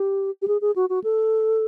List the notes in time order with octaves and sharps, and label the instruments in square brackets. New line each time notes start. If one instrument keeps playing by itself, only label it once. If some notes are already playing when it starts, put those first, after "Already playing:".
Already playing: [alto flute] G4
G4
G#4
G#4
F#4
F#4
A4